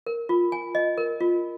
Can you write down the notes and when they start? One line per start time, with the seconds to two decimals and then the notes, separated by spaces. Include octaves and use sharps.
0.06 A#4
0.29 F4
0.52 G#5
0.75 D#5
0.98 A#4
1.20 F4